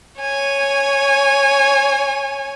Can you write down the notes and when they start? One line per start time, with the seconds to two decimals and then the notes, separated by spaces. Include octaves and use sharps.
0.21 C#5 G#5